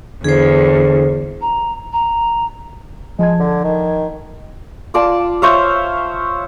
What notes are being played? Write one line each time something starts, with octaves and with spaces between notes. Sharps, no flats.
E2 D3 G#4 C5
A#5
A#5
F3 G#3 A5 G#6
D3
D#3
F4 D5 A5
C5 C#5 E5 F5